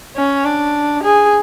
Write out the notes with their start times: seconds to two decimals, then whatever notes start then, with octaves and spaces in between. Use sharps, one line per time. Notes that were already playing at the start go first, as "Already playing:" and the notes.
0.16 C#4
0.45 D4
1.03 G#4